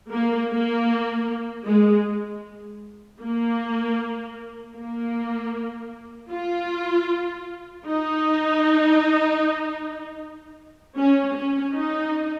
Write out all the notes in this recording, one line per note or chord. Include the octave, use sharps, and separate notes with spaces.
A#3
A#3
G#3
A#3
A#3
F4
D#4
C#4
C#4
D#4